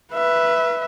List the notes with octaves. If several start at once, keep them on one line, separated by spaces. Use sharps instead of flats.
B4 E5